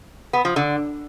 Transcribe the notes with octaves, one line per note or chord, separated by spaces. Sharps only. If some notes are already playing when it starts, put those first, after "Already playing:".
B3
F3
D3